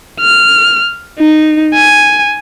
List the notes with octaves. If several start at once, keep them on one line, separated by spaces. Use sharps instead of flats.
F6
D#4
G#5